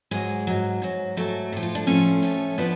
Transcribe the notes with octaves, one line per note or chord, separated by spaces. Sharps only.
G#2 F#3 G#3
G#2 F#3
G#2 F#3
G#2 F#3 A3
A2 F3
F4
D4
A2 F3 A3 C#4
A2 F3
A2 F3 B3 D4